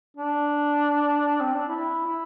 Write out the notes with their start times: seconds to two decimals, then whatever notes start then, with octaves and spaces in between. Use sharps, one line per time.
0.17 D4
1.41 C4
1.55 D4
1.68 E4
2.06 E4